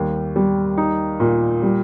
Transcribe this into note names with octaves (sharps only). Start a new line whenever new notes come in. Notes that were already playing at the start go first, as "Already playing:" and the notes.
Already playing: D#2 G3
G3
D#4
A#2
G3